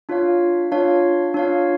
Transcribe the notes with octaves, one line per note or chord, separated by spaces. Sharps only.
D4 F4 C#5 F5
D4 F4 C#5 F5
D4 F4 C#5 F5